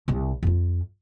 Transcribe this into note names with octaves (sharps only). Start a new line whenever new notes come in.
C2 C3
F2 F4